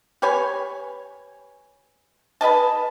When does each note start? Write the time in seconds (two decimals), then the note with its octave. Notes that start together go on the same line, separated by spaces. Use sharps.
0.22 G4 B4 C#5 G#5
2.41 G#4 B4 D#5 A5